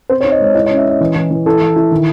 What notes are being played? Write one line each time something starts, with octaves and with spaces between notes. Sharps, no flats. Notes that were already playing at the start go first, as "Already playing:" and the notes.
C4 C5
C#5
D#4
D#5
G#3 C#5
E4 D#5
C#5
D#5
C#4
E5
C#4 D#5
E3
E3
E3
E4 A4
E3
E4
D#3